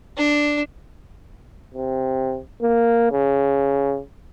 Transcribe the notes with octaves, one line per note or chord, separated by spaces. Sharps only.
D4
C3
A#3
C#3